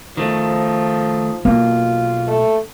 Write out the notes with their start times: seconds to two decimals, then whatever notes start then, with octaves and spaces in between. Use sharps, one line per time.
0.17 D#3 F3 A3
1.45 B1 A#3 F4
2.27 A3